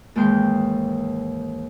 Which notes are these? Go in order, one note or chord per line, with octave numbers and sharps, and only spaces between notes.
D#2 G#2 E3 G#3 G5 C6